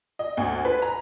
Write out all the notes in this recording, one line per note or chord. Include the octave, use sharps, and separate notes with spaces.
D#5
D2
B4
A#5